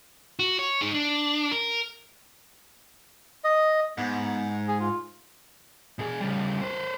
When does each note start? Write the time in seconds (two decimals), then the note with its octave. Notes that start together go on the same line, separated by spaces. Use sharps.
0.39 F#4
0.59 C#5
0.81 D#4 G#4
0.94 D4
1.52 A#4
3.44 D#5
3.98 G#2 B3
4.68 G#4
4.80 F4
5.99 B2 G#4
6.20 C#3 G3
6.62 B4 C5